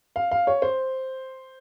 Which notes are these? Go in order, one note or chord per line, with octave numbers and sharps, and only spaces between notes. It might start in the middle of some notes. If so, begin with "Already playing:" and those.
F5
F5
C#5
C5